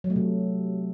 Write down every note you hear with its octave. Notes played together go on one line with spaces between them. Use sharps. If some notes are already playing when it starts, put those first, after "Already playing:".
F#3
A3
C3